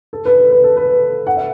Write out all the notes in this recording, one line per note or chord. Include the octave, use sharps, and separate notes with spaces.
A4
B4
A4
B4
A4
B4
A4
F#5
E5